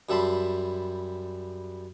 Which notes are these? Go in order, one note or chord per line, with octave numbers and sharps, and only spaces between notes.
F#2 G3 E5 A5 B5 C6